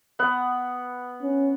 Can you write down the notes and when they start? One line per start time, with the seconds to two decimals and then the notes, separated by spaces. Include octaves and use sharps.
0.19 B3 F#5
1.22 C#4